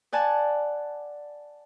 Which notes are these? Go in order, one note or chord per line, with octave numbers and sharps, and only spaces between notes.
D5 F#5 G#5 A5